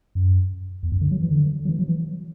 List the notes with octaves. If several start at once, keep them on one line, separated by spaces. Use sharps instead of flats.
F#2
E2
F#2
D3
F#3
E3
D3
F#3
E3
F#3
E3